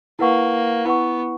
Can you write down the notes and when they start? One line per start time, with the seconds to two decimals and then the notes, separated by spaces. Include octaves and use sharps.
0.19 A#3 E4 B4 F#5 C#6
0.85 B3 E4 B4 F#5 C#6